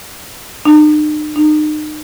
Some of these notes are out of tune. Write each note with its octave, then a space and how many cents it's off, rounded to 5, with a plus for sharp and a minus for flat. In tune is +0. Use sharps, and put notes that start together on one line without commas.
D#4 -45
D#4 -35